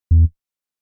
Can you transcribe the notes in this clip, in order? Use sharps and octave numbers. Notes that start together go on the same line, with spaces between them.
E2